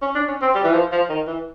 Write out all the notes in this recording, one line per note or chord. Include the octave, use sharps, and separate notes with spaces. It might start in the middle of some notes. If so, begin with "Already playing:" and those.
C#4
D4
C#4
C4
G3
E3
F3
F3
D#3
E3